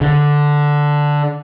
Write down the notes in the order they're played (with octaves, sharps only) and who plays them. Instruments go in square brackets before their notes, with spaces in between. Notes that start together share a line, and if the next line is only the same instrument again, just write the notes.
[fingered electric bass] D3